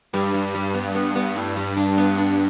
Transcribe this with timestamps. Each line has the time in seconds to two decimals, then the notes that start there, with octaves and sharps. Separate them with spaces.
0.13 G2 G3
0.34 G3
0.54 G3
0.74 B3
0.95 B3
1.15 B3
1.36 A2
1.56 G3
1.77 D4
1.98 B3
2.18 D4